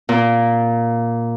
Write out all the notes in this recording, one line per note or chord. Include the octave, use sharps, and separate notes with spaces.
A#2